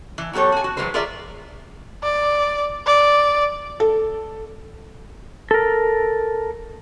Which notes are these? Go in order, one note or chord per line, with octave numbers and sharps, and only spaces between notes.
E3
F#3 B3 G4 A4 C#5
F#4 G#5
F#4
E3 F#3 G#3 B4 C5
F4 G#4 A#4 D5 E5 A#5
D5
D5
A4
A4 A#4